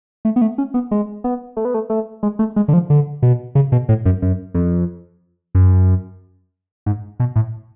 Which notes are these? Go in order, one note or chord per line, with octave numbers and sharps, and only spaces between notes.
A3
B3
A3
C#4
B3
G#3
B3
A3
B3
A3
A3
G#3
A3
G#3
D3
F3
D3
B2
C#3
B2
A2
F#2
F#2
F2
F#2
G#2
B2
A2